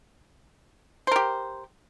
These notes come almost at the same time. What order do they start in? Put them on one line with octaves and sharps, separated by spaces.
C5 A#4 G4